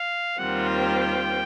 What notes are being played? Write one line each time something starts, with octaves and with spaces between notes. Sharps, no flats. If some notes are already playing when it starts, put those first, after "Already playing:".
Already playing: F5
D#2 D#3 G3 C4 F4 F#5
G5